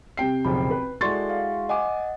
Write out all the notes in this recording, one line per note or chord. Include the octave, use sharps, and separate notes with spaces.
C3 G5 C7
F#1 B1 F3 B5
B4
G#3 E4 F#4 A4 D5 C6 C#6 A6
F5
D#5 F#5 G#5 D6